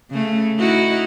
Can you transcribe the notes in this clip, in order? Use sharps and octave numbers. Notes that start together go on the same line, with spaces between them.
C#3 A3
D#4 E4 F#4